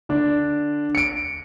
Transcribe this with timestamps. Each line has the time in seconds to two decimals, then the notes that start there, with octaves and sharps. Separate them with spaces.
0.09 D3 D4
0.95 C#7 D7